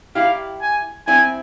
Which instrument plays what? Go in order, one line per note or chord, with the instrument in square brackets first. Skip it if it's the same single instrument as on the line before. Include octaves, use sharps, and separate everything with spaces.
[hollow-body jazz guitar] E4 G4 [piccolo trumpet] F5
[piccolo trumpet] G#5
[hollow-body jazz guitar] C4 E4 [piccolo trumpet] G#5